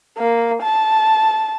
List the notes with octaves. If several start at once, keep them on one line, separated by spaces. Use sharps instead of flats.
A#3
A5